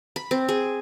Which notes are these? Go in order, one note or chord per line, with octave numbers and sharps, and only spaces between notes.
B5
C4
G#4